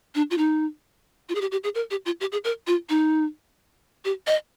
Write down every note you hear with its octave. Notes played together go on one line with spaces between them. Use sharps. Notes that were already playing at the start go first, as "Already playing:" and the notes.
D4
F4
D#4
F4
G#4
G4
G4
G#4
A#4
G4
F4
G4
G#4
A#4
F4
D#4
G4
D#5